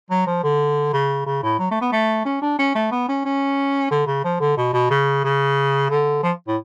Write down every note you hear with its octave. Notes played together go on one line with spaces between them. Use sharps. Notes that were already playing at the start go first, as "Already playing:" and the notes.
F#3
F3
D3
C#3
C#3
A2
F#3
A3
B3
A3
C#4
D4
C#4
A3
B3
C#4
C#4
D3
C#3
F3
D3
B2
B2
C#3
C#3
D3
F3
A2